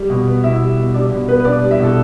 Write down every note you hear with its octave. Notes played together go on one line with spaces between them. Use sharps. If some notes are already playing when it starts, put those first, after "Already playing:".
Already playing: G3
B2
B3
B2 E4 E5
G3
B2
G3 D4 D5
B2
B3 B4
B4
B2 D4 D5
G3
E4 E5
B2 A4